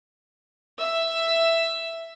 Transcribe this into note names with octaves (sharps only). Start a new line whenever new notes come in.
E5